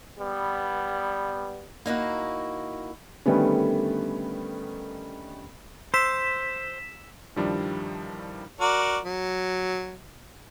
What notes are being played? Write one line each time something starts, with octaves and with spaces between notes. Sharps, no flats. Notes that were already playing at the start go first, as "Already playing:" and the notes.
G3 B3
A#3 D#4 E4 F#4
D3 D#3 G3 A3 B3 C#4
C5 E6 B6 E7
G2 D#3 F3 G3 D4 E4
F#4 A#4 D5
F#3